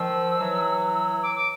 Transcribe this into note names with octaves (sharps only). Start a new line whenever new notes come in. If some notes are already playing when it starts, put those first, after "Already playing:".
Already playing: D#3 F3 E6
E3 F#3
E6
D6
D6